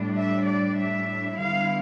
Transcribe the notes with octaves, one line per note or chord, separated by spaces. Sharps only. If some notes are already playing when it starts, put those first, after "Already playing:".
Already playing: A2 G3 D4
E5
D5
E5
D3 G3 B3 E4 F5